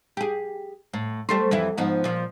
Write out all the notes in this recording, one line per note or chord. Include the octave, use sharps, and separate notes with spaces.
G4 G#4
A2
G3 A3 C5
F2 E3 E4
G#2 F3 B3
A#2 F3